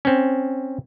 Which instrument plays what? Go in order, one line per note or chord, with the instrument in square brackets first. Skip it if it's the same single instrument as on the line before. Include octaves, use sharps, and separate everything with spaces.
[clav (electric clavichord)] C4 C#4